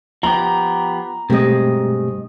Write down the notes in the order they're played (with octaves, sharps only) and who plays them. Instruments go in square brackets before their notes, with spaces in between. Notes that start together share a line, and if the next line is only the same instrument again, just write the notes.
[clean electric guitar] F3 B3 G4 [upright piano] A#5
[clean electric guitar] G2 D#5 [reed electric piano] B2 A3 G4 [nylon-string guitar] G#3 C4